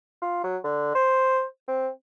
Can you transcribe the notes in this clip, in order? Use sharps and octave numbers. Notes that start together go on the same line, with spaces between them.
F4
F#3
D3
C5
C4